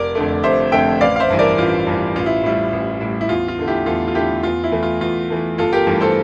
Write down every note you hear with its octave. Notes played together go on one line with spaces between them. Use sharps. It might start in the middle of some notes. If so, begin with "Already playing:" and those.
Already playing: F1 A#4 D5
F2 D3 A3
F1 C5 E5
F2 D3 A3 E5 G5
A1 D5 F5
F5
C5 E5
G2 E3
A#4 D5
A1 F4
G2 E3
A1 F4
E4
A2 G3 E4
A1
A2 G3
E4
E2 F4
F4
D3 A3
E4 G4
E2 F4 A4
F4
D3 A3 E4 G4
E2 F4
E4
E3 A3
F4
E2 F4
E3 A3
G1 F4 A4
G4 A#4
G2 E3 A3
A4 C5